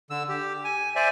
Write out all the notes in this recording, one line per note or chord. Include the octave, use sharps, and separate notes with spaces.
D3 E6
G4
G#5
C5 D5 E5 G#5